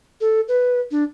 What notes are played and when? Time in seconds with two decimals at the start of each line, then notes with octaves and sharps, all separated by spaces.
0.21 A4
0.48 B4
0.91 D4